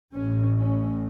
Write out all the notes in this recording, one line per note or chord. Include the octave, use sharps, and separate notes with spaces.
A1 A2 C#4
C#4